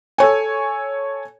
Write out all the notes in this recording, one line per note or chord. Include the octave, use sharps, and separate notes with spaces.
A4 C#5 G#5